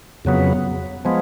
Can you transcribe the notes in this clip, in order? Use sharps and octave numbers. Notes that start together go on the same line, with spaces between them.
F2 C#3 F#3 B3
F3 G#3 B3